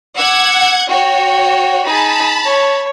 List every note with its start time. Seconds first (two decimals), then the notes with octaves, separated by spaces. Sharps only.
0.17 F#5 D6 E6 G#6
0.90 F#4 C#5 G5
1.85 D#4 G#4 A5 B5
2.45 C#5